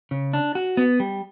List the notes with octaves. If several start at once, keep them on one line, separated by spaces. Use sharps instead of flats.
C#3
D4
F#4
B3
G3